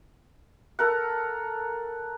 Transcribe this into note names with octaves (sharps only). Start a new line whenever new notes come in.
A4 A#4 F#5